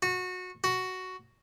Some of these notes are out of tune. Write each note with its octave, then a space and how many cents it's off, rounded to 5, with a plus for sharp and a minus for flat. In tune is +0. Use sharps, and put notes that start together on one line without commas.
F#4 -20
F#4 +5